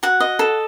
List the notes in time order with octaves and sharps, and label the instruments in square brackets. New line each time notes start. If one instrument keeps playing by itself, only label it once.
[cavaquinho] F#4 F#5
D#5
A4